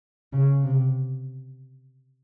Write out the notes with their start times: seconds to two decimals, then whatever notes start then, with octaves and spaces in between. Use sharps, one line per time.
0.33 C#3
0.63 C3